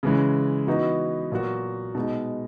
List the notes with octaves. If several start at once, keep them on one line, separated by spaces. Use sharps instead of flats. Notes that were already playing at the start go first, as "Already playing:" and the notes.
C#3 E3 G#3
E3 B3 D#4 F#4
A#2 F#3 B3 F#4
B2 G#3 D#4